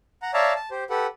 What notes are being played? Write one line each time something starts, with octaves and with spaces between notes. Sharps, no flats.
F#5 A#5
C#5 D5 E5 F5 A5 A#5
A5
G4 C5
G4 A4 B4 F#5